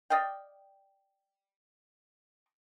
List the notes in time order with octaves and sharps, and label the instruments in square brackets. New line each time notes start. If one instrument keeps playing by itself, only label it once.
[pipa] D5 D#5 F5 G5